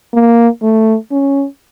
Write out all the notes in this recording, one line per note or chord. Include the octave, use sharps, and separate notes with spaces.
A#3
A3
C#4